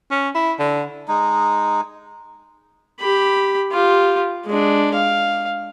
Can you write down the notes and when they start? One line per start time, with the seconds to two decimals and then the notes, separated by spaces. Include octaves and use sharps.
0.11 C#4
0.35 E4
0.59 D3
1.08 G#3 D#4
3.00 G4 B5
3.72 F4 G4
4.46 G#3 D4
4.94 F5